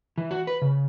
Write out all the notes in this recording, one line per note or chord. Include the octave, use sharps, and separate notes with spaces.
E3
F#4
B4
C#3